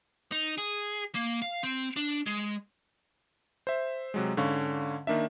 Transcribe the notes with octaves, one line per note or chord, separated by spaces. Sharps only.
D#4
G#4
A#3
F5
C4
D4
G#3
C5 E5
C3 F#3 G#3
G#2 D3 C#4 F5 C#6
D#3 A#3 D4 E5